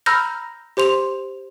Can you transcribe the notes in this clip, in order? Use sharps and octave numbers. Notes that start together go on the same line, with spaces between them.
A#5 B5 E6 F6 G6 A#6
G4 C5 C6 F7